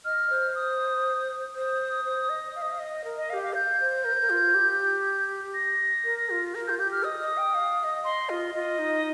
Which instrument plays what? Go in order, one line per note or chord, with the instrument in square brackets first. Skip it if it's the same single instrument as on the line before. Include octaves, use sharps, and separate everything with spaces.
[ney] D#5 [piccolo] F6
[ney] C5
[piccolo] D#6
[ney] C5 [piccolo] D#6
[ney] C5
D#5
F5
D#5
F5
D#5
A#4
[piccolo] D#5
[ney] A#4 [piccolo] F5
[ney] G4
[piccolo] F5
[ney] F5 [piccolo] G6
[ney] C5
A#4
C5
A#4
F4
G4
[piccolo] A#6
[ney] A#4
F4
A#4
[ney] F4 [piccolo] G6
[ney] G4 [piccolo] G6
[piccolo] F6
[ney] D#5 [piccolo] D#6
[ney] D#5
G5
F5
F5
D#5
[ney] D#5 [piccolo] C6
[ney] F4 [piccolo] D#5
[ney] F4 [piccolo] D#5
[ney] D#4